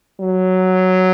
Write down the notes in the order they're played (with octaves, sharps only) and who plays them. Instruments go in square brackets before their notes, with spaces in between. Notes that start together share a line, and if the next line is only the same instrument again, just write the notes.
[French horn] F#3